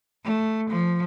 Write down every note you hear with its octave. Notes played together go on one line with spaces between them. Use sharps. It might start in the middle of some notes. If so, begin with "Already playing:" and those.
A3
F3